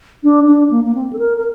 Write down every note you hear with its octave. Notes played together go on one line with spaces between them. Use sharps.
D4
D4
A#3
A#3
C4
A4
A#4
A#4